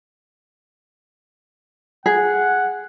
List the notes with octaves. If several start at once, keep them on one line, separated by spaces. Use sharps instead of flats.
G#4 F#5